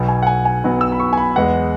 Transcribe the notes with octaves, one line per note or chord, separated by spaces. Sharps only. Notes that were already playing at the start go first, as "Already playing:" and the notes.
Already playing: B1 B2 F#3 B3
G#5
F#5
G#5
G#5
B1 B2 F#3 B3
E6
B5
C#6
G#5
B5
E2 E3 G#3 B3 F#5